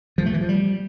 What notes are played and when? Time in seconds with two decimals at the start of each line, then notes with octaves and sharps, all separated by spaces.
0.18 F3
0.26 A3
0.33 E3
0.41 F3
0.49 G3